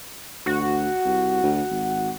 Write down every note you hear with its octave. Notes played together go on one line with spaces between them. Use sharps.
D2 F#4
C2
D2
G#1